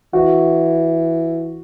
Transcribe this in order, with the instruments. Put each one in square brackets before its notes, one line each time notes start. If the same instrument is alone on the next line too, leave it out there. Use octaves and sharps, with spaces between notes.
[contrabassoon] E3 [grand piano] F#4